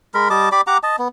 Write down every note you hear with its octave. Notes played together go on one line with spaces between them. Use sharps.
G#3 A#4 B5
G3 D#5 A5 D6
G4 D5 B5 D6
G4 F#5 A#5 D6
D#5 A5
B3